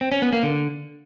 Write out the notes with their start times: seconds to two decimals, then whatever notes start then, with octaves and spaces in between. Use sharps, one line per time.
0.01 C4
0.12 C#4
0.22 B3
0.33 A#3
0.43 D3